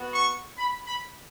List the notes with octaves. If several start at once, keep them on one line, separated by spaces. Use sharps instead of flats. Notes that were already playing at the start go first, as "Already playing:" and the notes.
Already playing: B3 F#4
C#6
B5
B5